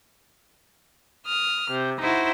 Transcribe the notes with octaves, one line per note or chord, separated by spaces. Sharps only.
D#6 F6
C3
D#4 E4 F#4 C5